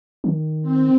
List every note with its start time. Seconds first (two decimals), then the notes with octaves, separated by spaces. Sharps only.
0.24 D#3
0.62 C4